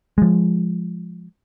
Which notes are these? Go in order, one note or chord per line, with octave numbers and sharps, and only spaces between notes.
F3 G#3